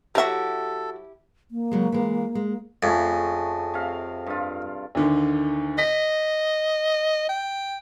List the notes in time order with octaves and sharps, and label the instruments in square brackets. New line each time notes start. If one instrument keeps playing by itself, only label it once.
[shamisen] F#3 E5 [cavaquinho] D#4 F#4 [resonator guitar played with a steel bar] E4 G4 [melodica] A4
[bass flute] A#3
[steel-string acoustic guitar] C#3 F#3 G#3
E3 G#3
G#3
[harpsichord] F2 [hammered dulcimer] C#3 A3 G#4
[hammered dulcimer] C3 F5
G2 F4
[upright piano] D2 D3 D#3
[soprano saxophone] D#5 [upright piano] B6
[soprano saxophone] G5